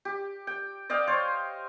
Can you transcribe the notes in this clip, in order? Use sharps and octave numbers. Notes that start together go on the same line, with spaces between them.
G4
G5
D5 D#5 F5 G5
C5 C#5 F5